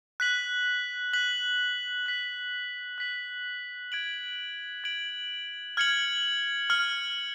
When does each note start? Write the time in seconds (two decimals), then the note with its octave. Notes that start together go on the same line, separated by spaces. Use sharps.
0.20 F#6 B6 F#7
1.13 F#6 B6 F#7
2.06 F#6 B6 F#7
2.98 F#6 B6 F#7
3.92 G#6 D7 F#7
4.84 G#6 D7 F#7
5.77 F6 G#6 C#7 F#7
6.70 F6 G#6 C#7 F#7